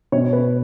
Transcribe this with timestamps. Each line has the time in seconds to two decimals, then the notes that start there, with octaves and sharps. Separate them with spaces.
0.12 B2 C#5
0.33 B4